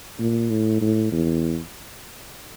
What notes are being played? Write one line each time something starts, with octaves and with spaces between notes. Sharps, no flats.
A#2
A2
A2
E2